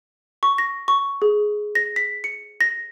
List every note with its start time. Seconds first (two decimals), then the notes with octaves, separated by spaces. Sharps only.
0.43 C#6
0.58 A#6
0.88 C#6
1.22 G#4
1.75 A#6
1.96 B6
2.24 C#7
2.61 A#6